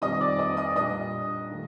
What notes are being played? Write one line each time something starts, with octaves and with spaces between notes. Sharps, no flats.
F2 D#3 G3 C4 D#5 D#6
D5 D6
D#5 D#6
D#5 D#6
A#2 G3 A#3 D4 D#5 D#6
D#3 A3